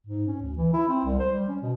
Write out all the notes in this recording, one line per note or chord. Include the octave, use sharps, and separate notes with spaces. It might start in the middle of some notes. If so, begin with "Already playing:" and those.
G#2
C#4
D2
E3
E4
C4
C2
C5
G3
C#4
B2